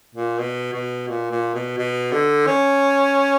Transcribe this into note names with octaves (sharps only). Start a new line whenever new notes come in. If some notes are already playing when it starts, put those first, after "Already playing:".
A#2
B2
B2
A#2
A#2
B2
B2
D3
C#4